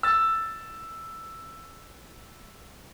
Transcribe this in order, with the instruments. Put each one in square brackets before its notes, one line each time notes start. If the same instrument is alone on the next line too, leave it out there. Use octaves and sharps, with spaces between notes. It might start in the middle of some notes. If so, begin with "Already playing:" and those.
[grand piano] E6 A6